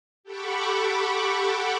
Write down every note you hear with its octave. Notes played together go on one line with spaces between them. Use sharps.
G4 A4 F#5 B5 C#6 D6